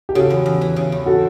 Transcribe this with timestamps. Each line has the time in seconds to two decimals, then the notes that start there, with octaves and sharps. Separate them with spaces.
0.09 G4
0.15 C#3 F#4 A4
0.30 E2
0.46 E2
0.61 E3
0.76 C#3
0.92 E2
1.06 F#4 A4